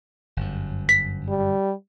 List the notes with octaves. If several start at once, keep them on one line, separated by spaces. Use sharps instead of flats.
G1 F#2
B6
G3